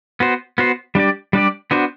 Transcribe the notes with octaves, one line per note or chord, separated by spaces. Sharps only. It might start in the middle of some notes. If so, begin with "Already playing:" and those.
B3 F#4 C5
B3 F#4 C5
G3 D4 G4 D5
G3 D4 G4 D5
B3 D4 F#4 C5